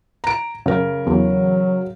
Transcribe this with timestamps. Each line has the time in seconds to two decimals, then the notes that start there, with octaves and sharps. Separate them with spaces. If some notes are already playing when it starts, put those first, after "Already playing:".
0.24 A#5 D7
0.66 F#2 C#3 A#4
1.07 E2 F#3